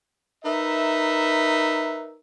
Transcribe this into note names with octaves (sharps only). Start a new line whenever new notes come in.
D#4 A#4 B4 E5